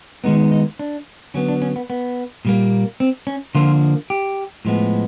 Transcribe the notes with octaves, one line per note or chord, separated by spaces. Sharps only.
D#3 G#3 B3 D#4
D#4
D4
D3 F#3 B3 C#4
D4
C#4
B3
B3
A#2 G3 A#3
C4
C#4
D3 F3 A#3 F4
G4
A2 F3 G#3 B3